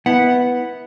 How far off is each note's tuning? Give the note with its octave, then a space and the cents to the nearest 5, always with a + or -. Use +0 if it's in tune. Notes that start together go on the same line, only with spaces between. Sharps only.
B3 +0 E4 -20 F#5 +0